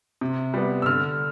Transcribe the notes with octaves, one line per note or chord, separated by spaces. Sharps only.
C3
G3 B3
E6
D3 F6